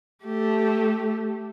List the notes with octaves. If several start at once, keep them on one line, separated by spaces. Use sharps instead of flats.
A3 G4